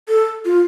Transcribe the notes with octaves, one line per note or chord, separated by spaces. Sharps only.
A4
F4